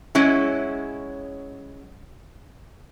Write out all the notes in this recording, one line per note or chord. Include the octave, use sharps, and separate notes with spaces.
F#3 G#3 C#4 E4